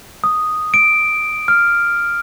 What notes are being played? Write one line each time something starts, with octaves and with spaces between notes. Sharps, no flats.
D#6
D7
F6